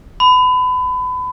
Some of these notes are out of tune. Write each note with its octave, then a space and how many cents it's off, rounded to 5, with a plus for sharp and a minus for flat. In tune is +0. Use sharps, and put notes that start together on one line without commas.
B5 +30